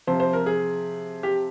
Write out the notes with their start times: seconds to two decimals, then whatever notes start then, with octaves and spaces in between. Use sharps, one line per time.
0.07 C3 F3 C5
0.20 C5
0.33 A#4
0.46 G#4
1.23 G4